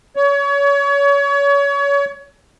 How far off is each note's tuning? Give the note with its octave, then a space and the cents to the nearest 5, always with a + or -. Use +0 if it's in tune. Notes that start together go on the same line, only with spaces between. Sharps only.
C#5 +30